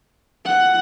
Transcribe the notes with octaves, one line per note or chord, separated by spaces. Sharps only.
F#5